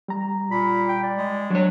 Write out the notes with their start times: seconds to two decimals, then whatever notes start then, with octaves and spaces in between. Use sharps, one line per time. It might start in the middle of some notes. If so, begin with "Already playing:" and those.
0.08 G3 A#5
0.51 A#2 B5
0.88 G5
1.03 D5
1.17 G#3
1.50 F#3 D4 C#5